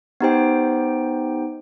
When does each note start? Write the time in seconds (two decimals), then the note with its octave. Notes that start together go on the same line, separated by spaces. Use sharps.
0.20 B3 D#4 G4 C5 G5